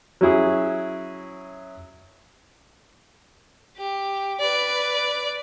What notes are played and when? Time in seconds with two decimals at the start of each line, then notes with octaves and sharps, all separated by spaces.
0.21 F#3 C#4 E4 G#4
3.77 G4
4.40 B4 D5